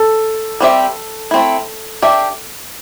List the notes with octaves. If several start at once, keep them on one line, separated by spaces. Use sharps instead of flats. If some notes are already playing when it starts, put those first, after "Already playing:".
Already playing: A4
G3 C4 G4 E5
A3 C4 E4
D4 G4 E5